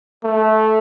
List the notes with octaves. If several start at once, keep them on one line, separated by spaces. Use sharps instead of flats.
A3